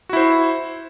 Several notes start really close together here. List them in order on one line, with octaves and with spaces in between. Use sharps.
F#4 E4 C5